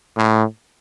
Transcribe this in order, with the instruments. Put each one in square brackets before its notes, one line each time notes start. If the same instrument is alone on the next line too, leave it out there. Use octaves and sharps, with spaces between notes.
[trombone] A2